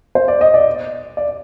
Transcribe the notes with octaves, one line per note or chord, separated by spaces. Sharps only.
C5
D5
D#5
D5
D5